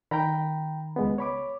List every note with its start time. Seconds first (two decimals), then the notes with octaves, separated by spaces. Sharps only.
0.11 D#3 G5 A#5 B5
0.96 C#2 G#3 B3
1.18 C#5 B5 D6